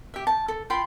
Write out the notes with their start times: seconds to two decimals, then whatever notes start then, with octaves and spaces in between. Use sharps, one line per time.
0.14 G4 E5
0.27 A5
0.48 A4
0.70 F4 G5 B5 C6